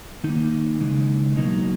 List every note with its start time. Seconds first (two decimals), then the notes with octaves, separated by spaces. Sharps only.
0.24 D#3 D#4
0.29 A#3
0.81 C#3 E3 G#3
1.37 B2 F#3 A#3 D#4